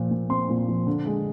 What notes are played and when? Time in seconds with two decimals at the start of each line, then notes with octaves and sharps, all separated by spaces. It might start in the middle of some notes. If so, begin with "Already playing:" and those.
Already playing: A#2 F3
0.11 A#2
0.29 C4 C6
0.49 A#2
0.68 F3
0.87 D3
1.06 G#3